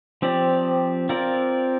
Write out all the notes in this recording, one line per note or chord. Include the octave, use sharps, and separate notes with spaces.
F3 C4 G4 D5
C4 F4 A#4 D5